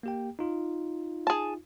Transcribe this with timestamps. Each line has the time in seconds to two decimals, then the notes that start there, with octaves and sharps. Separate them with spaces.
0.03 A#3 G4 G5
0.39 D#4 F4
1.27 G#4 A5